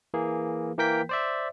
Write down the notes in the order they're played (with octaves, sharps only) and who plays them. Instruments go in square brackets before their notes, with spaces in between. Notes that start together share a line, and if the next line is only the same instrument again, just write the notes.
[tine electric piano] E3 A#3 G#4
E3 A#3 A#4 G5 G6 B6
C5 D5 E5